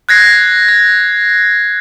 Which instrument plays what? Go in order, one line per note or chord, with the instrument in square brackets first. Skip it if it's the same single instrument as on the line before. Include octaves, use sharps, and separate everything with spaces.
[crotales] F#6 G#6 A#6 C7
G#6